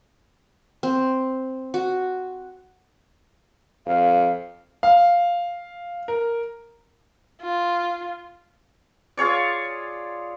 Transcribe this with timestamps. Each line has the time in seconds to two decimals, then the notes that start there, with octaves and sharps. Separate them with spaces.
0.83 C4
1.74 F#4
3.86 F2 F5
4.83 F5
6.08 A#4
7.42 F4
9.17 F4 G#4 C#5 D5